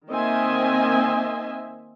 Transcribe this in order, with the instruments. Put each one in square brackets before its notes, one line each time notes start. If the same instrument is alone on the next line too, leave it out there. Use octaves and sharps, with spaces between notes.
[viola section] D#3 A#3 C4 D#5 E5 G#5